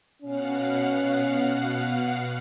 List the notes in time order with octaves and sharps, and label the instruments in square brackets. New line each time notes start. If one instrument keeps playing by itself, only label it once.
[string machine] B2 F5 F#5 [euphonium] C#4